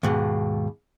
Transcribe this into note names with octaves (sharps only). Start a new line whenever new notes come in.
D#2 G#2 B2